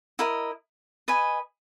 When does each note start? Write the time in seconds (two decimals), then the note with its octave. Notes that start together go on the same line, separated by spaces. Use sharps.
0.19 E4 A#4 D#5
1.08 B4 D#5 G#5